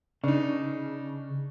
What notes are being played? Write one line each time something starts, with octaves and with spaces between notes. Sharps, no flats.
C#3 D4 D#4